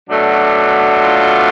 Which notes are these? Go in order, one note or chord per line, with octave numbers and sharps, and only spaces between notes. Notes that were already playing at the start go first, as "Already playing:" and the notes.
B2 F#3 A3 D4
F4